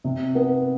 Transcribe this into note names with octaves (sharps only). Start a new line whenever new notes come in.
C3
B3